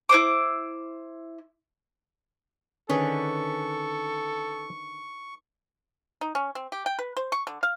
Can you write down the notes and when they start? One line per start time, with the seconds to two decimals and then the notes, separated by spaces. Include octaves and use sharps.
0.09 E4 B4 C5 D6
2.89 D3 D#3 C#4 G#4 A4 B4 C#6
6.21 D#4
6.35 C#4
6.55 C4
6.72 G4
6.86 G5
6.99 B4
7.17 C5
7.32 C#6
7.47 D3
7.63 F5